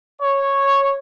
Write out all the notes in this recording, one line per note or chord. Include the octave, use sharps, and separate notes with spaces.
C#5